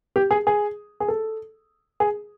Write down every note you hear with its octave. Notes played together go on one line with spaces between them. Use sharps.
G4
G#4
G#4
G#4
A4
G#4